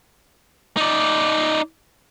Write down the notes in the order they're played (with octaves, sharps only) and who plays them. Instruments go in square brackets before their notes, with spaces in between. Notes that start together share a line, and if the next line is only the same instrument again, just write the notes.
[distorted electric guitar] D#4 D5